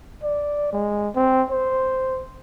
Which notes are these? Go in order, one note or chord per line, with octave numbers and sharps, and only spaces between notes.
D5
G#3
C4
C5